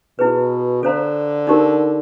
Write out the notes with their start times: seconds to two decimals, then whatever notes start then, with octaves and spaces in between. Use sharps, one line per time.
0.19 B2 E4 G#4 B4
0.83 D3 A4 C5 F5 A#5
1.47 D#4 G4 A#4